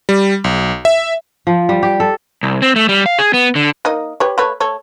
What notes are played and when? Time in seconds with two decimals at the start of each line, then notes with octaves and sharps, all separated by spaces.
0.09 G3
0.44 B1
0.85 E5
1.47 F3
1.69 G3
1.83 G4
2.00 A4
2.43 C2
2.62 C4
2.76 A3
2.89 G3
3.06 F5
3.19 G#4
3.33 B3
3.55 D3
3.85 A#3 D#4 D#5
4.20 G4 B4 C#5
4.38 A3 B4 C#5
4.60 A3 A4 C#5